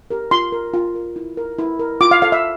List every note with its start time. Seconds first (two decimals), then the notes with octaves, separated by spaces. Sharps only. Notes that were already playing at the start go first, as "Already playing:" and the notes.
0.11 G4 A#4
0.31 F4 C6
0.52 A#4
0.73 F4
0.95 A#4
1.16 E4
1.37 A#4
1.58 E4
1.79 A#4
2.01 F4 D6
2.11 F5
2.22 A4 C5 F5
2.32 E5